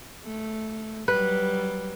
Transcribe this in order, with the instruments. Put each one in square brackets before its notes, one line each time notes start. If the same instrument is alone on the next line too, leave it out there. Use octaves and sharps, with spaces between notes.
[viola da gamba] A3
[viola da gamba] F#3 G3 [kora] B4